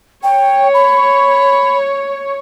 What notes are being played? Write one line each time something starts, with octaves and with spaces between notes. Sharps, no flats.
C#5 G5
B5